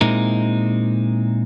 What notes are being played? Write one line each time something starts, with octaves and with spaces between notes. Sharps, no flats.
A#2 G#3 C4 D#4 E4 A#4